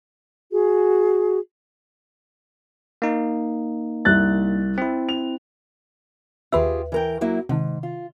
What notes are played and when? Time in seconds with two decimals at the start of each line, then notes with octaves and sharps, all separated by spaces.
0.52 F#4 G#4
3.02 A#3 D#4
4.05 C2 F#6 A6
4.78 C4 E4
5.09 F7
6.52 D#2 F4 G4 G#4 B4 E5
6.92 E3 A#4 G5
7.21 F#3 A#3 E4
7.49 G#2 C3 D#3
7.83 F4